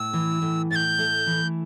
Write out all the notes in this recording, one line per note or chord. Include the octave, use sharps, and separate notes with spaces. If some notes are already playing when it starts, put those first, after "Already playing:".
Already playing: A2 E6
E3
A2
A2 G6 A6
A3
E3